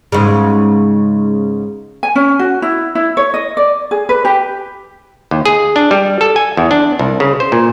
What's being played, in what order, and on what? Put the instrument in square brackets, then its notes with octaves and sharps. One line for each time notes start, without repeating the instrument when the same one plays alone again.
[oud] G#2 C#3
[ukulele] G#5
C#4
F#4
E4
E4
C#5
D#5
D5
G#4
B4
G4
[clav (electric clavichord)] D#2
G#4
D4
G3
A4
G#5
E2
D4
C2
C#3
C5
A#2